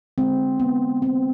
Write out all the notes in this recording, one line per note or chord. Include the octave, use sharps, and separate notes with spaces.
D3 G#3 C4
B3
C4